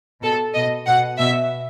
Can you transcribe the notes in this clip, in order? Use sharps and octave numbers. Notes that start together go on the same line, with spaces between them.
B2 A4
B2 D#5
B2 F#5
B2 E5